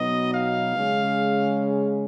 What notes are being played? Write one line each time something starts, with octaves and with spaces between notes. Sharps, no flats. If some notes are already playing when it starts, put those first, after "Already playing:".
Already playing: B2 F#3 B3 D#4 D#5
F5
C#3 G#3 C#4